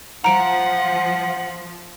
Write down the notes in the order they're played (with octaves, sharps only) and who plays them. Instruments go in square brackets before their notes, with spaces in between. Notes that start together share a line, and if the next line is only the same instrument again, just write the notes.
[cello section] F3 [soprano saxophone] F#5 [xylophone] A#5 D7